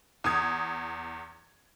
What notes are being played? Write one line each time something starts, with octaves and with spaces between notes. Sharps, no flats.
E2 D#6 G#6